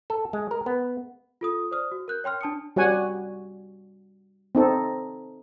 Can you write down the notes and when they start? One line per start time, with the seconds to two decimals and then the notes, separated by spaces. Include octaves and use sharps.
0.10 A4
0.33 G#3
0.51 A#4
0.66 B3
1.41 F4 A4 D#6
1.71 C5 D5 D#6 F6
1.92 F#4
2.08 A#4 F#6 G6
2.24 C#5 G5 C6 F6
2.41 D4 A5 D#6 C#7
2.76 G3 F#4 C#5 F#5 G#5
4.55 C4 D#4 A4